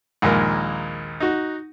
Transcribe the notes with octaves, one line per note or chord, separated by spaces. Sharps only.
A#1 D#2 G#3 A#4
D#4 F#4